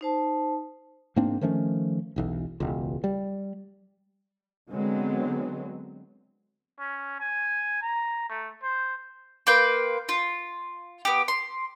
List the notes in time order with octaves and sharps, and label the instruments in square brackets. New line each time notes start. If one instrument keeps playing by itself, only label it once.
[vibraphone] D#4 C5 A5
[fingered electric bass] G#2 A#3 C4 D4
D#3 F3 A3 C#4
E1 B1 E3
E1 C#2
G3
[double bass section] D3 F#3 G#3 B3 C4
[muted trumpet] C#4
G#5
A#5
A3
C5
[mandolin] A#3 B4 G5 C6
F4
B3 G4
C6